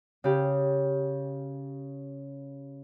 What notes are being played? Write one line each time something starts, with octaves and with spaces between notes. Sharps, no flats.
C#3 G4